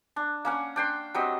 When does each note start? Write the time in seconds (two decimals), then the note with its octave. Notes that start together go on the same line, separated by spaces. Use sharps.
0.16 D4
0.45 A#3 C#4 F#5
0.76 D4 G5 C6
1.14 F#3 G3 C4 D#5